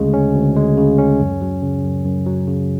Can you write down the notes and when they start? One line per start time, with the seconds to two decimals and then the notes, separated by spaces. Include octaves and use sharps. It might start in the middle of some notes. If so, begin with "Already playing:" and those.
Already playing: D2 C#3 G#3
0.14 C#4
0.35 D2
0.56 G#3
0.77 C#3
0.99 C#4
1.21 F#2
1.41 F#3
1.62 C#3
1.84 F#2
2.05 F#2
2.26 F#3
2.47 C#3